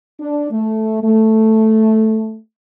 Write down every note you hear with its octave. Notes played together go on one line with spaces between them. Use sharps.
D4
A3
A3